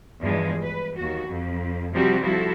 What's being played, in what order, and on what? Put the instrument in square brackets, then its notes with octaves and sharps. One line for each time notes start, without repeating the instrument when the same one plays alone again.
[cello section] E2 G2 E3 F3 G#3
B4
D#2 F#4
F2
C3 F3 G3 C4 F#4 G4
F3 E4 F#4 A4